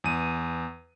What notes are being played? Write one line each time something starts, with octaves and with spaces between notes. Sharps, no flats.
E2 D#7